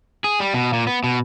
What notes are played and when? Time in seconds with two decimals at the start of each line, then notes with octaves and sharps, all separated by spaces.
0.24 G#4
0.40 G3
0.54 B2
0.73 A#2
0.87 B3
1.04 B2